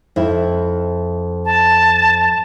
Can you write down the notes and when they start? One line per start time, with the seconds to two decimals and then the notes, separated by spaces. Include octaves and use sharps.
0.16 F2 E4 E5
1.45 A5